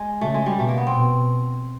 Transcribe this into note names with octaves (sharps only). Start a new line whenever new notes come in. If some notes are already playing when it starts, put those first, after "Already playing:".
Already playing: G#3
C#3 A3
G#3
G3
B2 A3
A#3
B3
C4
B2